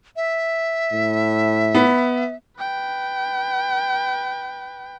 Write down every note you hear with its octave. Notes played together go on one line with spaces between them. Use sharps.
E5
A2
B3
B4 G5